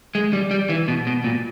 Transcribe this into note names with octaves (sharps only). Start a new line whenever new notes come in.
G#3
G3
G3
E3
B2
B2
A#2